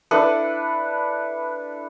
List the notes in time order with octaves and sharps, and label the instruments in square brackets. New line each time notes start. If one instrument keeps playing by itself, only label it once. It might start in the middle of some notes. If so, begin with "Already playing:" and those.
[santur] D4 E4 A4 B4